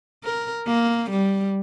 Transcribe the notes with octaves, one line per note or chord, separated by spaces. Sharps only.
A#4
A#3
G3